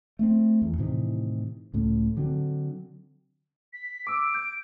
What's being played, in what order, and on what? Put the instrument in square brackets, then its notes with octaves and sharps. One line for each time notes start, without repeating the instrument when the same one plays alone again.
[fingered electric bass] A3 C4
E2
A2 C3 D#3 E3
C#2 A2
D3 F#3 C4
[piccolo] B6
[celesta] D6 E6 [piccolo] D7
[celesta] G6